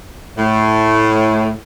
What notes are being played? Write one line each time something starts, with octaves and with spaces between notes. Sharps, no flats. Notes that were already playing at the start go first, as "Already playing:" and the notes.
A2